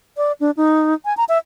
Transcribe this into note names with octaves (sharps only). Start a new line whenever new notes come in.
D5
D4
D#4
G#5
A#5
E5